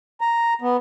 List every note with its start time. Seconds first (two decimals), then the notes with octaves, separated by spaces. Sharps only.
0.21 A#5
0.62 B3